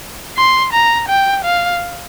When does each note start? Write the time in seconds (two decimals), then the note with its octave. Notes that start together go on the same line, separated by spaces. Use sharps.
0.37 C6
0.73 A#5
1.08 G5
1.44 F5